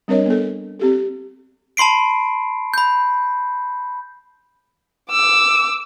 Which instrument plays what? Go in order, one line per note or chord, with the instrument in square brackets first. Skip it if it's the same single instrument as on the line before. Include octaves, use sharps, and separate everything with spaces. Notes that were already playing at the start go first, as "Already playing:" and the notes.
[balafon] G3 C4 D4 A#4 C#5 D#5
B3 A4
C4 G4 A4
[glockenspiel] A5 B5 C6 C7 D7
B5 G6
[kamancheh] D6 E6